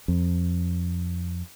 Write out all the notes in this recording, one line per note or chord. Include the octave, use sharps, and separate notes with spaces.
F2